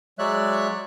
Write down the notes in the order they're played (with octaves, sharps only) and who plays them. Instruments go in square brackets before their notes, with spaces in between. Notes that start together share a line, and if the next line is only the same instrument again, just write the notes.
[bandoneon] F#3 G#3 C#5 D5 E5 F#6